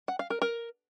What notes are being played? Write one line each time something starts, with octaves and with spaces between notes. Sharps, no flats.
F#5
F5
A#4
A#4